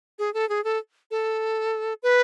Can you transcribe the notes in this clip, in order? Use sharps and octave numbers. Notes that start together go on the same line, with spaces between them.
G#4
A4
G#4
A4
A4
B4